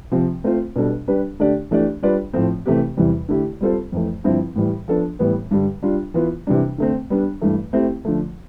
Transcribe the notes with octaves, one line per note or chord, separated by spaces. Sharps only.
C3 F3 C4
A3 C4 F4 C5
B2 G3 D4 A4
G3 D4 G4 B4
D3 A3 D4 G4 D5
E3 A3 D4 G4 D5
G3 D4 F4 B4 D5
A2 F3 A3 C4
C3 E3 A3 C4 G4
E2 C3 E3 G3
D3 A3 E4 G4
G3 C4 F4 A4 C5
F2 E3 A3
G2 D3 F3 C4 E4
A2 E3 G3
F3 B3 D4 A4
A2 E3 G3 B3
G2 D3 G3
G3 D4 F4
E3 B3 F4
C3 E3 G3 D4
D3 A3 C4
G3 B3 D4
G2 E3 A3
A3 C4 E4 G4
D3 F3 A3